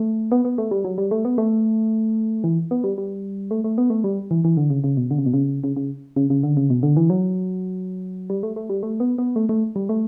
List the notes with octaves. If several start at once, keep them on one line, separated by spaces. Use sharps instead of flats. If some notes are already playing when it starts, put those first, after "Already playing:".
Already playing: A3
B3
B3
A3
G3
F#3
G3
A3
B3
A3
E3
B3
G3
G3
A3
A3
B3
A3
G3
E3
E3
D3
C#3
C#3
B2
D3
C#3
B2
C#3
C#3
C#3
C#3
C#3
D3
C#3
B2
D3
E3
F#3
G3
A3
A3
G3
A3
B3
B3
A3
A3
G3
A3